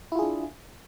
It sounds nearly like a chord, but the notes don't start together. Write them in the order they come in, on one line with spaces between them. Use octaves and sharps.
E4 F4 G#4 D4